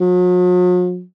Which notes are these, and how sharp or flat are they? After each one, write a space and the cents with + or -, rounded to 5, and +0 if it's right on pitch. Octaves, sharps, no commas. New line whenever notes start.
F#3 -45